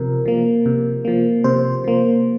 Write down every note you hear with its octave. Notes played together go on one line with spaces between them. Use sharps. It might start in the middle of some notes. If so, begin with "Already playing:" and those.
Already playing: C3 F3 A#4
F3 A#3
C3
F3 A#3
C3 C5
F3 A#3